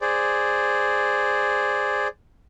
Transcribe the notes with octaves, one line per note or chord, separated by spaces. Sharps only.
G#4 C5 D5